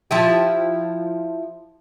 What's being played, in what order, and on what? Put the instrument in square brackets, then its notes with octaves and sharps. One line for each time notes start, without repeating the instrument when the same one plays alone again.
[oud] F3 E4 G4